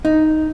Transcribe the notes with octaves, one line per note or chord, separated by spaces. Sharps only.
D#4